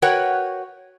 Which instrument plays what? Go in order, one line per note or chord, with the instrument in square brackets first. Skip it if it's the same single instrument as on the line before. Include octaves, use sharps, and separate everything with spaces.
[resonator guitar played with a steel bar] F#4 A#4 B4 C#5 F#5 G5